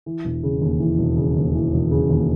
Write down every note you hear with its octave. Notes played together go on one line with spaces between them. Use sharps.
E3
E1
C#3
D#2
E3
E1
C#3
D#2
E3
E1
C#3
D#2